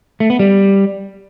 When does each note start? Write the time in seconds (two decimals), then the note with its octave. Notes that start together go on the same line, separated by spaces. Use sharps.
0.20 A3
0.30 B3
0.39 G3